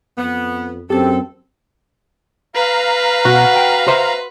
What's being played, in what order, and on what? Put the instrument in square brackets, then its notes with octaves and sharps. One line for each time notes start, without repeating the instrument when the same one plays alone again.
[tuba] F2 [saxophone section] B3
[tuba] F#2 [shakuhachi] C4 [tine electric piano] G4 [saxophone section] A4
[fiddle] B4 [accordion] F5 A#5
[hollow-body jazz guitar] B2 [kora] F#4
[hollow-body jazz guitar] G5
C5 E5 C6